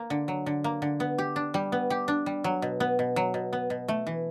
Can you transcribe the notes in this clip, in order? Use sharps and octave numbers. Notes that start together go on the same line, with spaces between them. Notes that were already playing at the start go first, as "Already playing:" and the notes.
Already playing: A#3
D3
F#3
D3
A#3
D3
B3
G4
D4
G3
B3
G4
D4
G3
F#3
B2
B3
B2
F#3
B2
B3
B2
A3
E3